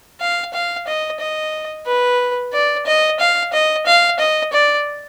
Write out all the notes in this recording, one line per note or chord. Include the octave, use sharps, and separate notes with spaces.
F5
F5
D#5
D#5
B4
D5
D#5
F5
D#5
F5
D#5
D5